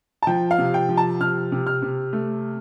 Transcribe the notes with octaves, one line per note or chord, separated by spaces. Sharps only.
A5
F3 G5
F5
C3
G5
F3
A5
C3 F6
C3
F6
C3
A3